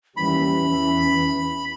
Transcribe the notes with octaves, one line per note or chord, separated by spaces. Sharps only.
D#2 E3 G3 C#4 B5
E2 E3